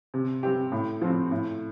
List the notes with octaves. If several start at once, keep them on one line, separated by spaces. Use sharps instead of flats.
C3
G3 C4 G4
A2
F3 C4
A2